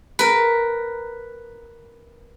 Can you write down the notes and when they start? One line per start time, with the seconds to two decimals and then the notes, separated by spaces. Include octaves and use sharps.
0.19 A#4 B4